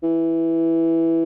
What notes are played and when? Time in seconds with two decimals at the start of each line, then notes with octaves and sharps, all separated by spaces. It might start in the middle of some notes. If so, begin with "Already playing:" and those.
0.03 E3